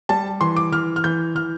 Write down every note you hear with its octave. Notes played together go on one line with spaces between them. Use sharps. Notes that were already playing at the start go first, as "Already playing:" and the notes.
G3 A5
E3 C6
D6
E3 F6
F6
E3 G6
E3 F6